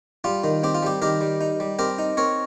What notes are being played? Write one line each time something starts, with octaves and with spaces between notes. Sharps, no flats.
G3 F4
D#3
C4 G4
F4
G3 G4
D#3 G4 A#4
G3
D#4
G3
C4 G4 A#4
D#4
C4 A#4 C#5